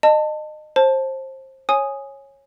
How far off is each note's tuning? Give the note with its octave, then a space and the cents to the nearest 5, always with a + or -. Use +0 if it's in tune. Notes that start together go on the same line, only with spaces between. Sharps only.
D#5 -25 A5 +20
C5 +25 A5 +0
C#5 -15 G#5 +0 D#6 +0